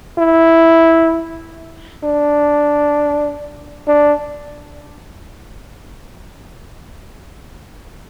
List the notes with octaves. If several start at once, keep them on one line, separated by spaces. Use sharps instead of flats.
E4
D4
D4